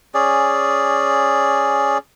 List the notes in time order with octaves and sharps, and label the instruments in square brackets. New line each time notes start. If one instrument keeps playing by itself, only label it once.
[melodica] C#4 G#4 D5